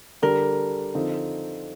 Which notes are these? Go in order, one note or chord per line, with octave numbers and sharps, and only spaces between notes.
D3 G3 D4 A#4
D3 F3 C4 D#4